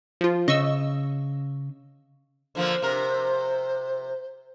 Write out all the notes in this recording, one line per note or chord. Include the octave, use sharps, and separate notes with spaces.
F3 F4
C#3 D#5 C#6 E6
D3 F3 A#3 C5
C3 A#4